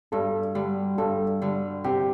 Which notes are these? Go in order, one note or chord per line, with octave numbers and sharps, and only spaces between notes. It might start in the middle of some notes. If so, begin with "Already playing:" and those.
G2 A4
D3 G3
G2 A4
D3 G3
C3 G4